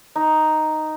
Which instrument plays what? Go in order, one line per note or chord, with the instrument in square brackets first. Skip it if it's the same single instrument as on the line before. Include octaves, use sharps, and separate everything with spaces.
[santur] D#4